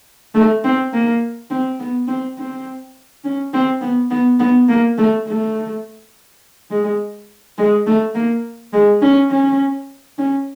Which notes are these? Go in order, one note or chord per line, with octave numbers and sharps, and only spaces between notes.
A3
C4
A#3
C4
B3
C4
C4
C#4
C4
B3
B3
B3
A#3
A3
A3
G#3
G#3
A3
A#3
G#3
C#4
C#4
C#4